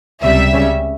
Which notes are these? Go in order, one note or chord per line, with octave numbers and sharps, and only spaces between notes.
C#2 C3 G3 E5
C#2 C#3 G3 C#4